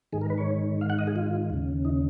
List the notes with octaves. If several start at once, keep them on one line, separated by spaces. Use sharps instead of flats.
G#2 D#3 G#4
A#4
B4
C#5
F5
F#5
D#5
G#4
F4
D#2 C#3
D#4